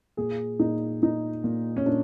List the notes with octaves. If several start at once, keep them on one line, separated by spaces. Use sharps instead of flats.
A#2 G#4
A#2 D#4
A#2 D#4
A#2
C#4
A#2 D4